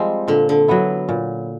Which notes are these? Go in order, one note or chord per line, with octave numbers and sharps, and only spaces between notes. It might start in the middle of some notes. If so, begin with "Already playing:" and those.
Already playing: F3 G3 G#3 C4
A#2 D3
D3
F#3 B3 E4
A#2